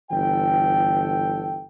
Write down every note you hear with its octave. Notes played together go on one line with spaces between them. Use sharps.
G1 E3 A4 G5